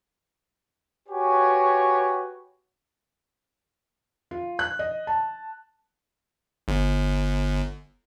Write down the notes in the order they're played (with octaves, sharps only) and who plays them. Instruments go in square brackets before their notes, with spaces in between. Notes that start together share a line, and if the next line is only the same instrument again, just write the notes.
[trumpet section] F#4 G4 B4 C#5 G#5
[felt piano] F4
F#6
D#5
A5
[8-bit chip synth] G1